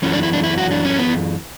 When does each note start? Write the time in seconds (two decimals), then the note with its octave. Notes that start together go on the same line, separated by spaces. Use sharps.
0.02 F#2 E3 C#4
0.13 D4
0.23 E4
0.33 D4
0.44 E4
0.58 F#4
0.71 D4
0.85 C#4
0.99 B3